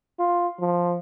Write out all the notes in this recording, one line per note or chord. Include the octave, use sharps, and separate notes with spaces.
F4
F3